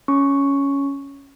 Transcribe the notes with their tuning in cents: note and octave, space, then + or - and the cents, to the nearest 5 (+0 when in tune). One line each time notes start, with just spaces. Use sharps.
C#4 +5 C#6 +0